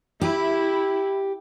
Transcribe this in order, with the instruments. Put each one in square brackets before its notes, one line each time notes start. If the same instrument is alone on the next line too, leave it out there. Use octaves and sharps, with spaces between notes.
[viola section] E4 [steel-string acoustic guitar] G4